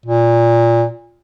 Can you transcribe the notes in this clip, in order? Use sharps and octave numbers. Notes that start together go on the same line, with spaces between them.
A#2